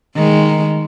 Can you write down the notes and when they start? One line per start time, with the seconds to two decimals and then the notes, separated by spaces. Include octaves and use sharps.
0.16 D#3 G#3